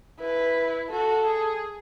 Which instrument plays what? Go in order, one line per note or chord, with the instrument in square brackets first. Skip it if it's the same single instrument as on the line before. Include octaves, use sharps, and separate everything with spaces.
[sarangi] E4 [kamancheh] B4
[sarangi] F#4 [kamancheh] A4
[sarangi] G#4